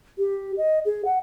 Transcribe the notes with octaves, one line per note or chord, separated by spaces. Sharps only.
G4
D#5
G#4
F#5